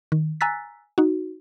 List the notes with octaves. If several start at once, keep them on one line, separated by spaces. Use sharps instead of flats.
D#3
G#5 A#5 E6 F#6 A6 B6
D#4 F#4